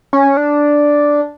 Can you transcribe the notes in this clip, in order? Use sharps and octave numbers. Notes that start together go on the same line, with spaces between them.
C#4
D4